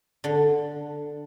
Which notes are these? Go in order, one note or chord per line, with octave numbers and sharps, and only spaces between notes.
D3